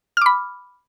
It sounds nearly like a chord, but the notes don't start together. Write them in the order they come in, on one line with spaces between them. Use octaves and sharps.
F6 D6 B5